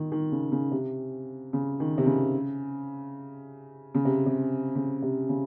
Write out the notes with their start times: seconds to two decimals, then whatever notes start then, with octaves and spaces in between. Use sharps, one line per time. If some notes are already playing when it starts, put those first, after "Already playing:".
Already playing: D#3
0.12 D#3
0.32 C#3
0.52 C#3
0.71 C3
1.53 C#3
1.80 D#3
1.98 C3
2.06 C#3
3.95 C#3
4.05 C3
4.26 C3
4.75 C#3
5.02 C3
5.29 C#3